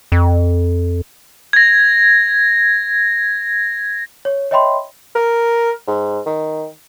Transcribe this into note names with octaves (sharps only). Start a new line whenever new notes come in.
F2
G#6 A#6
C#5
C#5 D#5 E5 G5 B5 C6
A#4
G#2
D#3